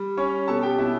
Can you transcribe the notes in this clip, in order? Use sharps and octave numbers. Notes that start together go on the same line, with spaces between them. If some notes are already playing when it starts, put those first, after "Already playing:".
Already playing: G3
C#4 C#5 C#6
B2 A4 A5
G4 G5
B2 E4 E5